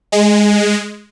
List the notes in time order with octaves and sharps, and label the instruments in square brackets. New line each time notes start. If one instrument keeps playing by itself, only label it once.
[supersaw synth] G#3